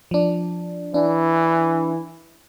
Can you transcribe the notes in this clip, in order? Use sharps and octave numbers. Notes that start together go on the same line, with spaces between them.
F3 D4
E3 D4